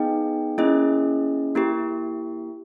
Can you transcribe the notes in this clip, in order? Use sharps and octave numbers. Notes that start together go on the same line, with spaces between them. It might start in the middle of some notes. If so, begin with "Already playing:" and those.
Already playing: B3 D#4 G#4 D#5 G5
A#3 C#4 E4 G#4 D#5
A#3 E4 G4